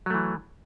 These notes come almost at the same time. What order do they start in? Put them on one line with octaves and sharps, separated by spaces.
F#3 A3 E3